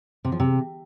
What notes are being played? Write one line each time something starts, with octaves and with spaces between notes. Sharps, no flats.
C3
F3
C3